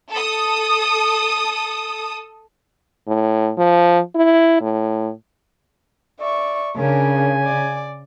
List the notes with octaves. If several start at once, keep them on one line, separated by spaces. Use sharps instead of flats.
A4 D#6
A2
F3
E4
A2
D5 E5 C#6
C#3 D4 A#4 G#5
D5